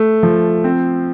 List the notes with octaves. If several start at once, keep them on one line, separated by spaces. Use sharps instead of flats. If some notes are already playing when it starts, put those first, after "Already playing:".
Already playing: A3
F3
C4